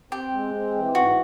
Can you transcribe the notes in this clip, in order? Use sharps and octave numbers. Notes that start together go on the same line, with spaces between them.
C4 G4
G#3
C4
E3
G#2 F#4